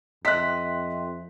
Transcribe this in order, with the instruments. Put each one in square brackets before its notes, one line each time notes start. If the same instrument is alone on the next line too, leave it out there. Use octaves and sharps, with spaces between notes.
[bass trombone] F2 [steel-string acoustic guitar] D#5 [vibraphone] E5 G5 C6 [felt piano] F#6 B6